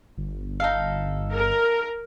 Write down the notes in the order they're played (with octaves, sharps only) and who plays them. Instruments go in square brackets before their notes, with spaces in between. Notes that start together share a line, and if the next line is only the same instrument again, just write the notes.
[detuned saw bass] G1
[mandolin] D#4 A4 F5
[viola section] A#4